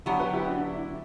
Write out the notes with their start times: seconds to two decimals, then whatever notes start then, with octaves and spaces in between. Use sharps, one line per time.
0.06 D3 F#3 B3 E4 G4
0.20 G4 B4
0.33 E4 G4
0.47 D4 F#4
0.61 E4
0.79 E4